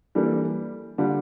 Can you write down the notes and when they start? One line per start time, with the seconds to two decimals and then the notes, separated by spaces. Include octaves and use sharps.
0.15 E3 G3 A#3 D4 A4
0.98 D3 G3 D4 F4